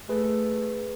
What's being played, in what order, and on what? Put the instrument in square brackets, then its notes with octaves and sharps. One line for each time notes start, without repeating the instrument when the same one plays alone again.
[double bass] A3 [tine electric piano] G#4 B4